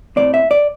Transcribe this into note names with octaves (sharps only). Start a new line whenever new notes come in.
A2 G#3 C4 D5
E5
D5